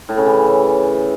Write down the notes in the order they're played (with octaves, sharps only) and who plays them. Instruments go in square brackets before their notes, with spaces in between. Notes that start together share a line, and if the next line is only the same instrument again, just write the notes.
[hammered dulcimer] A2
C#3
E3